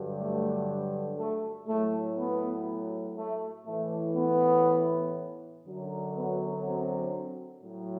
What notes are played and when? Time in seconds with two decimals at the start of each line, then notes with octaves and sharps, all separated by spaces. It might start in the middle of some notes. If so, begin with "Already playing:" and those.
Already playing: G2 D3 F#3
0.20 A3
1.19 A3
1.68 A2 F#3 A3
2.18 B3
3.18 A3
3.66 A2 E3 A3
4.16 B3
5.65 F#2 D3 F#3
6.15 B3
6.65 C4
7.64 A2 F#3